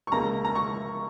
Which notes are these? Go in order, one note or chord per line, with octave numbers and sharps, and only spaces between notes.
C#6
C#2 C#3 A#3 A#5
A#5
C#6